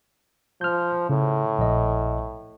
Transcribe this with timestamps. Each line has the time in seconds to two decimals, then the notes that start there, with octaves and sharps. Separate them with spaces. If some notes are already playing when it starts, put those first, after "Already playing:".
0.61 F3 F6 G6
1.09 A2 C#3
1.59 A#1 D#5